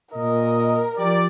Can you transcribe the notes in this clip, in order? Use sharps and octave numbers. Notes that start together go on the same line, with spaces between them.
A#2 A#4 D#5
F3 G4 D5